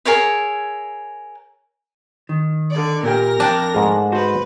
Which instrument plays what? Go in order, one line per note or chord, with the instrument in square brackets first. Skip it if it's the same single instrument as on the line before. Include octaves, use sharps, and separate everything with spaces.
[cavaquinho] G#4 A#4 C#5 E5
[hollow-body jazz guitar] D#3
[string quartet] D3 D5
[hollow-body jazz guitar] A#2 G4 G5 [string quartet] A#4 A#6
[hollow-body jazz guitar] F2 G5 [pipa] D4
[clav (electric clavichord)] G#2 A3 G#4
[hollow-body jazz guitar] F#4 C5 [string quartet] B4